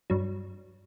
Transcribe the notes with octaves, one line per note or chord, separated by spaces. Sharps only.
G2 F#3